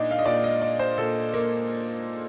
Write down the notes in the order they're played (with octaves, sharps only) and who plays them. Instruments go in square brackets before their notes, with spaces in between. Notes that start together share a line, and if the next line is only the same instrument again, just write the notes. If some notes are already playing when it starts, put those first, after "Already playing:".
Already playing: [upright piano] A#2 D4 D#4
F5
D#5
A#2 D5
D#5
D5
C5
A#2 A4
A#3